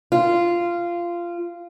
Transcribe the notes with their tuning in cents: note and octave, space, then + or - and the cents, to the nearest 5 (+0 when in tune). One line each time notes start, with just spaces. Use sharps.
F4 -15